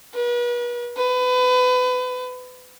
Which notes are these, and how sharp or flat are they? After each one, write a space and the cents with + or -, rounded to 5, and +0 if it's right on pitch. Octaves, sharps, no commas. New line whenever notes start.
B4 -40
B4 +30